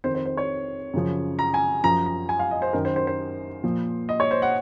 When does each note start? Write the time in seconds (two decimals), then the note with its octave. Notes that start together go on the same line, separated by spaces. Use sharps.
0.04 F2 D#3 C5
0.15 C5
0.26 C5
0.37 C#5
0.93 F#2 C#3 F3
1.39 A#5
1.54 G#5
1.83 F#2 F3 A#5
2.06 A#5
2.29 G#5
2.39 F5
2.51 D#5
2.62 C5
2.73 F#2 D#3 A#4
2.85 C5
2.96 C5
3.07 C5
3.63 A#2 F3
4.09 D#5
4.20 C#5
4.31 C5
4.42 F#5